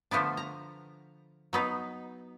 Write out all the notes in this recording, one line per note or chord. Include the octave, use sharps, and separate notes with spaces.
D3 F3 A3 B3 D4
A#5
F#3 B3 D#4